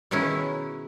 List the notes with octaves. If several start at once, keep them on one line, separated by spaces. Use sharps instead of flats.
B2 D#3 G#3 C#4 E4